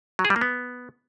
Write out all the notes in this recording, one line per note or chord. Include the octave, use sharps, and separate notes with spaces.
F#3
G#4
G3
A#3
B3